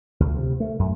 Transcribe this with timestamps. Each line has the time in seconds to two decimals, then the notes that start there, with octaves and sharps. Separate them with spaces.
0.20 D2
0.36 C3
0.60 A3
0.79 F#2